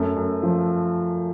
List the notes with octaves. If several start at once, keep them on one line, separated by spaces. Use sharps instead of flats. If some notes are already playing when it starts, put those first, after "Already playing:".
Already playing: F#2 A3
F#2
F3